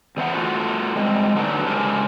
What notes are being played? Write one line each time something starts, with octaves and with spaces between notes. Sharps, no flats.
E2 E3 B3 C5 E5 F#5
A3 F4 F#4
G3 G#3 C4
D3 F#3 A3 D4 D#4 B4
C#3 G#3 C#4 G4 A#4 C5